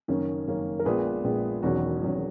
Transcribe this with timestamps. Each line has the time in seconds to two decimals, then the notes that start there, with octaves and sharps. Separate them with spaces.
0.08 F#1 F#2 D#3 A#3 C#4
0.47 F#1 F#2 D#3 A#3 C#4
0.79 A#4
0.85 A#1 A#2 G#3 B3 G#4 B4
1.24 A#1 A#2 G#3 B3
1.63 E1 E2 D#3 F#3 C#4 F#4
2.01 E1 E2 D#3 F#3 C#4